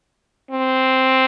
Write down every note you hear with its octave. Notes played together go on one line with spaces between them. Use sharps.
C4